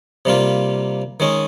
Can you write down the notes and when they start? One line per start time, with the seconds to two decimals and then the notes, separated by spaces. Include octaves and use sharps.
0.25 C3 G3 A#3 F4
1.20 D#3 G#3 C#4